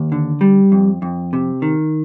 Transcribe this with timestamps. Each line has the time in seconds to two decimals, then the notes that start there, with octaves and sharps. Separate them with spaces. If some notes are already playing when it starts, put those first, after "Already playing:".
Already playing: D#2
0.12 D3
0.41 G3
0.72 F2
1.02 F2
1.33 C3
1.62 D#3